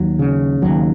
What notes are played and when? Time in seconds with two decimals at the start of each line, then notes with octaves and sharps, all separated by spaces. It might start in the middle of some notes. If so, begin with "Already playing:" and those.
Already playing: D#2 F#3
0.19 C#3
0.62 D#2 F#3